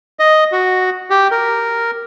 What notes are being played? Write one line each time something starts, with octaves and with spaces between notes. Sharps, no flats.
D#5
F#4
G4
A#4